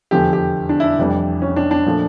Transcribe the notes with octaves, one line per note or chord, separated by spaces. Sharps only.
F1 E2 D3 F3 G4
G4
D4
E4
D4
F1 F2 E3 G3
C#4
D4
D4
A#2 F3 A3